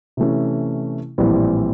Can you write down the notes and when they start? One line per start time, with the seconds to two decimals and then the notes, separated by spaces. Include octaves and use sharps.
0.17 C3 E3 A3 C#4
1.18 A#1 A2 E3 G3 C4